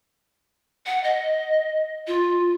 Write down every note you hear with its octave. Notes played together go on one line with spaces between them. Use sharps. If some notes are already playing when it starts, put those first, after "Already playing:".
F#5
D#5
F4